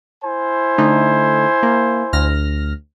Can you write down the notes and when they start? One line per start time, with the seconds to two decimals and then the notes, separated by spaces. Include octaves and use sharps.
0.23 E4 C5 G#5
0.78 D3 A3 D#4
1.63 A#3
2.13 D2 F6 A#6